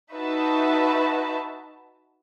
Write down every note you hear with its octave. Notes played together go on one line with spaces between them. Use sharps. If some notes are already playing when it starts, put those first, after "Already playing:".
D#4 F#4 B4 E5 A5